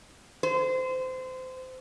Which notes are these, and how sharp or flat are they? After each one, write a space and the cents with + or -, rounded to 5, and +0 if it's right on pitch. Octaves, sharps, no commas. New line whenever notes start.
C5 -25